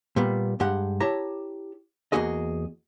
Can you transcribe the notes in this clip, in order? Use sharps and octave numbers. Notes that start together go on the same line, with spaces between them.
A#2 G3 B3
G2 G#3 G4 F#5
E4 G4 C#5 A5 A#5
E2 C#3 A#3 F#4 G#4 D#5